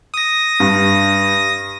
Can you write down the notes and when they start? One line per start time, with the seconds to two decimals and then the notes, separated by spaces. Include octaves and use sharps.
0.14 D#6 A#6
0.60 G2